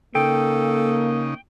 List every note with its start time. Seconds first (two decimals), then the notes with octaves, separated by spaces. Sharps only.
0.15 C#3 A#3 D#4 A4 G5